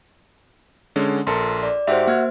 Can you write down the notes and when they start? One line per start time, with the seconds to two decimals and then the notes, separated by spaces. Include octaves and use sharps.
0.96 D3 G#3 C#4
1.27 A#1 A4 A#4 C6
1.63 D5
1.87 G#2 F#4 G4 C5 E5
2.07 A#3 F#4 F6 G#6